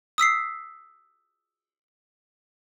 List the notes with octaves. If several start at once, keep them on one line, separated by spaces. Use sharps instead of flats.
D#6 E6 B6 C7